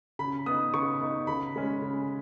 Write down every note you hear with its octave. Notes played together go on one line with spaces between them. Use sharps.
C#3 B5
B3 D#4 D#6
C#3 C#6
B3 D#4
C#3 B5
G#3 C#4
C#3